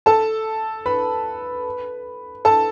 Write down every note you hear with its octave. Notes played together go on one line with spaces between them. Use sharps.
A4 A5
B4 B5
A4 A5